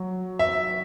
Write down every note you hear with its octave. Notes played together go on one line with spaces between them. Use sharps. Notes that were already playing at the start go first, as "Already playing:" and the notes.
Already playing: F#3
E5